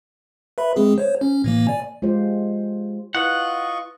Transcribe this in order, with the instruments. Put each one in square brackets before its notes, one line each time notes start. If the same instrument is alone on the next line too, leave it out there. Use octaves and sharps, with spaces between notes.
[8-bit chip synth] B4 E5 B5
G#3 C4 G#4
C5 C#5
C#4
A2 E3 A#3
D5 G#5
[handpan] G#3 F4 G4 C5
[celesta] E4 B4 F#6 [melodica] F4 D#5 C#6 [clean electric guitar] F#5